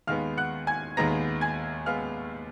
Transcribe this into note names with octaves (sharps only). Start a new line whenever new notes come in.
D#2 D#3 G#3 B3 F5 F6
F#5 F#6
G#5 G#6
D#2 D#3 G#3 B3 A#5 A#6
G#5 G#6
G#3 B3 F5 F6